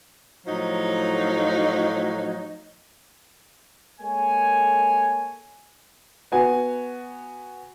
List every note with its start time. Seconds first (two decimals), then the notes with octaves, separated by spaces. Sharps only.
0.45 A2 F3 F#3 D#4
4.00 G#3 A#3 A4 C#5 G#5
6.32 B3 F#4 G#5